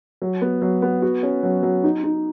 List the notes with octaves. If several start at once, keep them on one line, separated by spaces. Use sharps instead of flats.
F#3
B3
F#3
B3
F#4
C#4
F#3
F#3
D#4
D#4